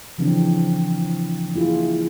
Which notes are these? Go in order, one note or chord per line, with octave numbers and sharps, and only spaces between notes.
C#3 E3 F3 C4 D4
A#3 E4 F4 G#4